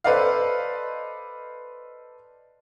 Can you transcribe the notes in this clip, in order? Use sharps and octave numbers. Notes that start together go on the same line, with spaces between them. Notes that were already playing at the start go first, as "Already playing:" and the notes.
A4 B4 C5 D5 D#5 F5